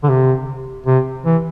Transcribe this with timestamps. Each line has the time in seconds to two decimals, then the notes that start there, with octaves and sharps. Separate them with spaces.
0.03 D3
0.09 C3
0.86 C3
1.25 E3